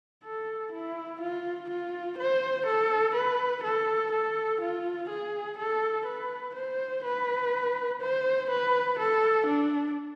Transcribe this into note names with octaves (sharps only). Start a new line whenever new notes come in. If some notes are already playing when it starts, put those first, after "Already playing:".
A4
E4
F4
F4
C5
A4
B4
A4
A4
F4
G#4
A4
B4
C5
B4
C5
B4
A4
D4